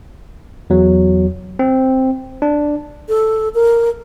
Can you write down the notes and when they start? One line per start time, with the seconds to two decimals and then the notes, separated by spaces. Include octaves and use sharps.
0.70 E2 F#3
1.59 C4
2.42 D4
3.09 A4
3.54 A#4